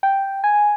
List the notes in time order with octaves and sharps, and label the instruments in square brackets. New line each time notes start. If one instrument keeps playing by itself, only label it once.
[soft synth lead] G5
G#5